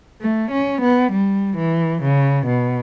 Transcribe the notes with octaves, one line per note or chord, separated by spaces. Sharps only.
A3
C#4
B3
G3
E3
C#3
B2